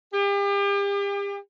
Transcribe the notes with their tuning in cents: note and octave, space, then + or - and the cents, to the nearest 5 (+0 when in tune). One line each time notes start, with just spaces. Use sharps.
G4 +40